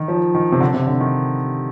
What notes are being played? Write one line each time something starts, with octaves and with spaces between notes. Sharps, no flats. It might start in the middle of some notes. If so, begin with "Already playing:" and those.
Already playing: D#3
F3
D#3
C3
D3
C3
D3
D#3